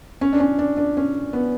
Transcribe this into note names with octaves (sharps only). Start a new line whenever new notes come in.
C#4
D4
C#4
D4
D4
C#4
B3